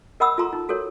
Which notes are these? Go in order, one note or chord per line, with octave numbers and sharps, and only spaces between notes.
A#4 D#5 F#5 B5 D#6 E6
F4 A4 A#5 C6
D#4
F#4 A4 A#4 C#5